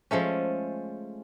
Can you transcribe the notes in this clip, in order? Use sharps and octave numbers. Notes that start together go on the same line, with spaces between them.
F3 G#3 A3 C#4